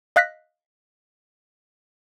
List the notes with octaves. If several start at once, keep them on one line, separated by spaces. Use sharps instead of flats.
D#5 F5 F#6 A#6 B6